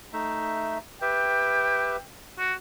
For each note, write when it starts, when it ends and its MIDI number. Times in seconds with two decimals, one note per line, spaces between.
0.13 0.78 57
0.13 0.78 63
0.13 0.78 76
1.02 1.97 67
1.02 1.97 71
1.02 1.97 76
1.02 2.02 79
2.39 2.54 66